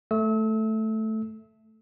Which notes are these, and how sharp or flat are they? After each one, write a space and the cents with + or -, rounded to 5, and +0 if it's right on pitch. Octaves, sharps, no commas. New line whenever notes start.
A3 +0 E6 -35